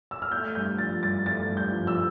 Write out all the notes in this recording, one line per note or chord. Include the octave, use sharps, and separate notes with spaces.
E6
F6
A3 G6
G2 G6
F3 A6
G2 A6
A3 A6
G2
G6
F3
E6